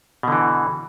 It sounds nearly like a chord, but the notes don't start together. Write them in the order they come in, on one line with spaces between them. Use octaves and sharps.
B2 D3 E3